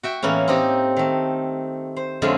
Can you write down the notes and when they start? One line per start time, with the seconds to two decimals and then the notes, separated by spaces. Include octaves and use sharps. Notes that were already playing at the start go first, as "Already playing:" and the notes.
0.03 F#4 E5 G5
0.23 A2 E3 A#3 B3 C#4
0.48 C4 D#4 G4
0.97 D#3 A3
1.96 C5
2.22 F2 D3 G#3 A3 C#4 F4